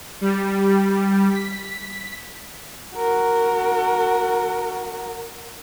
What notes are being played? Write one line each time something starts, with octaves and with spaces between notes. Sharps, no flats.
G3
B6
F#4 A#4